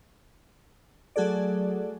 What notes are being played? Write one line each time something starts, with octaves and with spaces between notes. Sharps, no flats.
F#3 A3 F#4 G#4 A4 D5